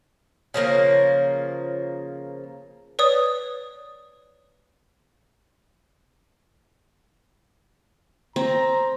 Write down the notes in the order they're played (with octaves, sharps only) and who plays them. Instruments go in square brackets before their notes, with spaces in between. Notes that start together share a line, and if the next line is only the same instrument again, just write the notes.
[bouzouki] C#3 F3 A#3 A#4
[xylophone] B4 C#5 D5 D#6
[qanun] C4 [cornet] A#5